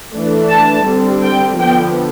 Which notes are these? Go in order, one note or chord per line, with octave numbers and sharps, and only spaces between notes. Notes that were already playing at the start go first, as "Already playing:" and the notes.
E3 A3 D4
A5
D3 G3 C4
G5
D3 F3 B3 G5